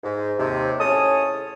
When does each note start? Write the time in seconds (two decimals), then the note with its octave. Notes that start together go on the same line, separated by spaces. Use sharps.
0.04 G#2
0.38 D#2 C3
0.80 A2 C#4 G#4 C#5 A5 D#6